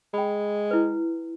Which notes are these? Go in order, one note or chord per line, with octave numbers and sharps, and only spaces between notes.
G#3 G5 B5
E4 B4